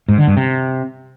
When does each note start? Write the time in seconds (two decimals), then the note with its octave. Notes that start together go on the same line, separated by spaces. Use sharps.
0.08 G#2
0.18 D3
0.27 G2
0.37 C3